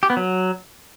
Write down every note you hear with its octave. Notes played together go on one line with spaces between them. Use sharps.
G4
B3
F#3